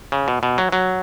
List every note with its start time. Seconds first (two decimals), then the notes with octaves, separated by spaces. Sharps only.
0.12 C#3
0.28 B2
0.43 B2
0.58 F#3
0.72 F#3